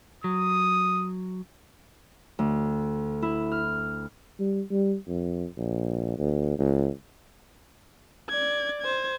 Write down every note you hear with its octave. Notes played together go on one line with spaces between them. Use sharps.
F#3 D#6
D2
E4
F6
G3
G3
F2
A#1
D2
C#2
D5 G#6
C5 G#6